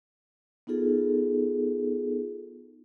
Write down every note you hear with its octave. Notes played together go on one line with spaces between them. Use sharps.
B3 D#4 F4 G#4 A4